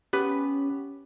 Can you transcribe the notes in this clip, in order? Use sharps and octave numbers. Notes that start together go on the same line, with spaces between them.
B3 C#4 G4 B4